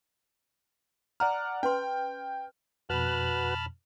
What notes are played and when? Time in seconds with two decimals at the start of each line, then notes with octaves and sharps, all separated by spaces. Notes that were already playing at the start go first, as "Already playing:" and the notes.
1.20 D5 F#5 A#5 F6
1.63 C#4 B4 G5 C6
2.90 F2 B2 F#4 B4 A5 B5 F6 F#6